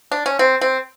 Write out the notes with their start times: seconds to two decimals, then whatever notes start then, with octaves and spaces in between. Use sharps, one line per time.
0.12 D4
0.26 C#4
0.39 C4
0.61 C4